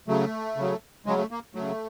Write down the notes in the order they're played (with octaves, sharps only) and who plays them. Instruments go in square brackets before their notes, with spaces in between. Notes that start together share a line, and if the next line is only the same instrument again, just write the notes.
[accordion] C#3 F#3 A3
C#3 F#3
C#3 F#3 G#3
A3
A#3
C#3 F#3 A3